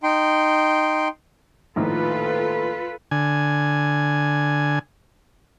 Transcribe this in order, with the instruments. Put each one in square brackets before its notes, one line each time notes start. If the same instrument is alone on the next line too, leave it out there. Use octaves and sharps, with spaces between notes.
[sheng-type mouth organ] D#4 G5 C6
[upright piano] A#1 A2 D#3 [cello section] F4 A4 B4
[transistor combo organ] D3 G#5